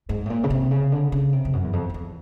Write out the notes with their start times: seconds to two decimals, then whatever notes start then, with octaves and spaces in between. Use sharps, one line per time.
0.09 G#2
0.26 A2
0.30 A#2
0.44 C#3
0.50 C3
0.71 C#3
0.92 D3
1.12 C#3
1.33 C3
1.45 F2
1.53 F#2
1.64 E2
1.73 F2
1.90 F2
1.94 E2